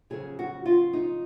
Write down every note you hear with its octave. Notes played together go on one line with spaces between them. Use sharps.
F2 C#3 F#3 G#4
F#4
F4
D#4